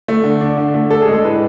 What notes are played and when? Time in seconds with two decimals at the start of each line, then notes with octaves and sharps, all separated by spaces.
0.08 A3
0.24 D3
0.41 D4
0.58 D3
0.74 A3
0.90 D4 A4
1.02 G#4
1.08 G#3 A4
1.24 A2 B4